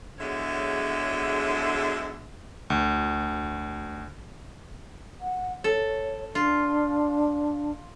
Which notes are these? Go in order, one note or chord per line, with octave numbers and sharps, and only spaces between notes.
E2 D3 F#3 G#3 C#5 E5
D2
F#5
A4 C#5
D4 F4